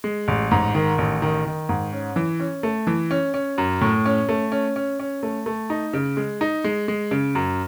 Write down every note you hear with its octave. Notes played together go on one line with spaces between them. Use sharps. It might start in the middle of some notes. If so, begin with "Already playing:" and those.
G#3
A1
G#2
D#3
A1
D#3
D#3
G#2
C#4
E3
C#4
A3
E3
C#4
C#4
F#2
A2
C#4
A3
C#4
C#4
C#4
A3
A3
D#4
C#3
G#3
D#4
G#3
G#3
C#3
F#2